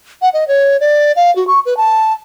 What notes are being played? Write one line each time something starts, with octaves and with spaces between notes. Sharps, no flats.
F#5
D#5
C#5
D5
F5
F#4
C#6
B4
A5